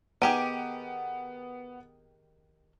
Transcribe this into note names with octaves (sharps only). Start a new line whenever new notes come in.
D#3 B3 G4 G#4 D7 D#7